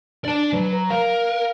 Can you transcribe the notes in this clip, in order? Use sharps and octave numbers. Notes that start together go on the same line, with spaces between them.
D4 D5 A5
F#3 B4
A#5
A#4 F5